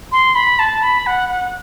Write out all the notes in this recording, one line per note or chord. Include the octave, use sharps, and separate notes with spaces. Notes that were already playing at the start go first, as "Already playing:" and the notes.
C6
B5
A5
B5
F#5
F#5